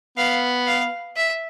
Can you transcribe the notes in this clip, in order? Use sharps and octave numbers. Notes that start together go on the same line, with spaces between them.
B3 F5
F5
E5